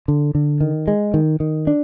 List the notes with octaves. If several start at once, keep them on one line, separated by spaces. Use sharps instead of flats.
D3
D3
D#3
G#3
D#3
D#3
D4